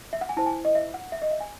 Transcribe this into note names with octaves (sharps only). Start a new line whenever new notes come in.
E5
F#5
G#5
E4 C5 A5
G#5
D#5
E5
F#5
E5
D#5
E5
G#5